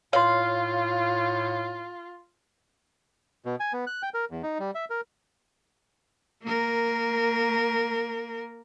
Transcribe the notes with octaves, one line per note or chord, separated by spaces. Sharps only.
A2 F4 C#5 F5 C6
B2
G#5
B3
F#6
G5
A#4
E2
D#4
G3
E5
A#4
A#3 A#4